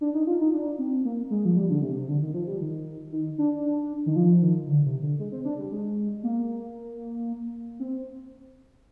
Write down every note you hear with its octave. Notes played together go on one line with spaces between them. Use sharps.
D4
D#4
F4
D#4
D4
C4
A#3
G#3
F3
G3
D3
C3
C3
D3
D#3
F3
G3
D#3
D#3
D4
D#3
F3
D#3
D3
C3
D3
G#3
C4
D4
G3
G#3
A#3
C4